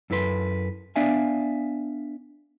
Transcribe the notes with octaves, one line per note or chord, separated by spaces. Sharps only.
F#2 E4 A4 B4 C6
B3 D4 D5 E5 F5 G#5